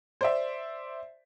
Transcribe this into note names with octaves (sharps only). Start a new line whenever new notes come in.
C5 D5 E5